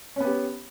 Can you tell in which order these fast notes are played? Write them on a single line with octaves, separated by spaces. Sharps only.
C#4 B3 G4